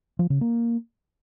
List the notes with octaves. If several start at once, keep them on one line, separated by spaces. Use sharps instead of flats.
F3
C#3
A#3